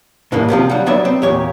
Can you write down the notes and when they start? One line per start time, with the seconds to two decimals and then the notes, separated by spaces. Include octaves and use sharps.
0.32 A2 C#3 E3 G3 A#3
0.48 D2 C3 F3 C4
0.70 F#3 G3
0.86 F#3 B3 C#5 D5 E5
1.05 C4
1.22 E2 A#2 G4 C#5